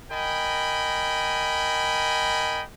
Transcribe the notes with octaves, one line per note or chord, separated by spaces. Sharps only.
A#4 D#5 G5 G#5 B5